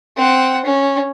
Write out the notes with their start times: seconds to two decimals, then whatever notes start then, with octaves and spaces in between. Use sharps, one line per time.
0.17 C4 F#5
0.65 C#4